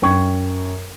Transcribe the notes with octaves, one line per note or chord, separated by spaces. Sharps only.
F#2 G5 C#6 G#6